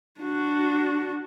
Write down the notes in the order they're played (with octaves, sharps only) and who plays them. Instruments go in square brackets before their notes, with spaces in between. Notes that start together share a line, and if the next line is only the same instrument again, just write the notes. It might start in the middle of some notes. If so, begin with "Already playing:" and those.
[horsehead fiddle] D4 F#4